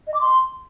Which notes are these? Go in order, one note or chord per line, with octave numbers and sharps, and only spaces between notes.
D#5
D6
C6